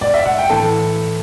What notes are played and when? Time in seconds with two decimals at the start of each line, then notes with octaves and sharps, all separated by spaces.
0.01 D5
0.14 E5
0.25 F#5
0.38 G5
0.49 A2 E3 A4 A5